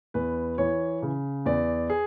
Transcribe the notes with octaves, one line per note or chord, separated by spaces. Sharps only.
E2 B4
E3 C#5
C#3
E2 D5
G#4